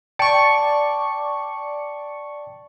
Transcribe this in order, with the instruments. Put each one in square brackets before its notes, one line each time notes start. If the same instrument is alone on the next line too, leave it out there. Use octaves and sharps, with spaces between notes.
[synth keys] D5 C#6 [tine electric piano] G5 A5 C#7